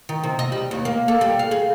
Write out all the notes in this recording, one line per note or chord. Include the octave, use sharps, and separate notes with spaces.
D#3
C3
D#5
G3
D#2
A#3
A4
G3
F5
G#4